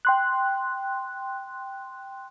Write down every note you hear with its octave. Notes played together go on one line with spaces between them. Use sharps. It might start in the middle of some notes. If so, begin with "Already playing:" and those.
G5 C6 F#6